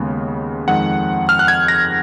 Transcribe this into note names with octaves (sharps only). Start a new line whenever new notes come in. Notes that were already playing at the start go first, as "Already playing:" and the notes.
Already playing: D#2 C#3 G#3 B3
F2 D#3 G#3 F#5
F6
F#6
G#6
A#6